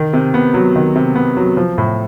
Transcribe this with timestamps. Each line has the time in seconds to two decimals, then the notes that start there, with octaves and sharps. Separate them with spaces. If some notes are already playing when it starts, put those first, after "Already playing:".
Already playing: D#3
0.13 C3
0.34 B3
0.54 F#3
0.76 D#3
0.96 C3
1.15 B3
1.37 F#3
1.57 F3
1.78 A2